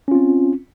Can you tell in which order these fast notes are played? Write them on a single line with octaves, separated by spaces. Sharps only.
C#4 F4 C4